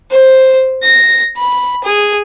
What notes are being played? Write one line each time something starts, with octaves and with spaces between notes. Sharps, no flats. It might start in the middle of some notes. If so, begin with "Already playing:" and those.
C5
A#6
B5
G#4